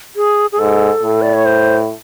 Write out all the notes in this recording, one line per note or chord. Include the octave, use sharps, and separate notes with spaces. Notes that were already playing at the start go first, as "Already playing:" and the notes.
G#4
G#4
G#2 A4
A2
D5
C#5
C5